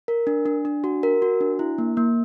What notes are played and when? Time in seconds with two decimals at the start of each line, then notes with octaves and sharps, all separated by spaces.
0.08 A#4
0.27 D4
0.46 D4
0.65 D4
0.84 F#4
1.03 A#4
1.22 F#4
1.41 D4
1.59 E4
1.78 A#3
1.97 A#3